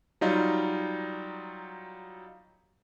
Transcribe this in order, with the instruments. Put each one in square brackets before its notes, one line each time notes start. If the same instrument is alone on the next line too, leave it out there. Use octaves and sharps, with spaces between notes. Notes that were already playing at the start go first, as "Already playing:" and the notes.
[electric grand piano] F#3 G3 D#4 F4